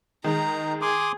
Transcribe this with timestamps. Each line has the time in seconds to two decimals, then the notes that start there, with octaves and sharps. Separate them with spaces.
0.24 D#3 G#3 D#4 A#5
0.82 G#4 C6 D6 D#6